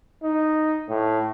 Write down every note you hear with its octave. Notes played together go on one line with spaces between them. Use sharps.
D#4
A2